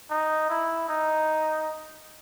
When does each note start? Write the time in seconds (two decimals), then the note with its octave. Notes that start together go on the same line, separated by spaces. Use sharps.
0.10 D#4
0.49 E4
0.89 D#4